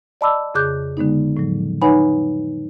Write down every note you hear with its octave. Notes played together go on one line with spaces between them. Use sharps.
D5 D#5 A5 B5 D6 E6
F2 C#3 G#4 D6 F#6 G6
D3 G#3 B3 D#4
A2 F3 F#3
D#4 B4 C#5 F#5 G#5 B5